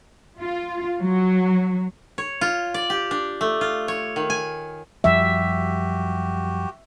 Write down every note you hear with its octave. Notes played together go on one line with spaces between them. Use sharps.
F4
F#3
C#5
F4
D5
G4
D4
A3
F4
C#5
D#3
G#5
F#2 F3 G3 F#4 G4 E5